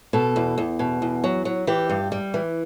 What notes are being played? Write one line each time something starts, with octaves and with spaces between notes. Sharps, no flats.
B2 A4
E2
E2
B2
E2
F#3
F#3
E3 G4
G2
G3
E3